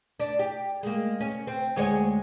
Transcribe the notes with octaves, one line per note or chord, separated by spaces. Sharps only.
D4
G4
G#3 A#3
C#4
C4
D2 G#3 C#5